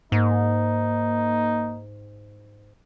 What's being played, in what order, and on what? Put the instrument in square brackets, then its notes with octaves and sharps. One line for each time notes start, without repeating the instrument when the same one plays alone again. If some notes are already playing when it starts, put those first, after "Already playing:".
[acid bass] G#2 [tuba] A#3 [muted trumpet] D#4